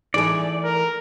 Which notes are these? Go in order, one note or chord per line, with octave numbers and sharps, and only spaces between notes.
E3 A3 D#4 G#4 A4 D5
A#4